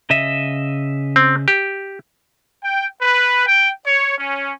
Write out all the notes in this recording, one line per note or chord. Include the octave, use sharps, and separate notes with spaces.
C#3 D#5 E5
C4
G4
G5
B4
G5
C#5
C#4